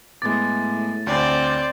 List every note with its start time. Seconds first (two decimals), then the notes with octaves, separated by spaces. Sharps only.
0.22 A2 G#3 B3 D6 A6
1.07 D2 C4 D5